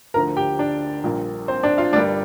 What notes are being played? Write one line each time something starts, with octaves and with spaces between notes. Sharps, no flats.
D2 D3 F3 A#4 A#5
G4 G5
D4 D5
A#1 A#2 G3 A#3
C4 C5
D4 D5
F4 F5
G1 G2 G3 A#3 D4 D5